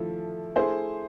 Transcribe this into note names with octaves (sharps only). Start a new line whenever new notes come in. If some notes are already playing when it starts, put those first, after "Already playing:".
Already playing: F3 A3 E4 A4
A3 E4 G#4 C5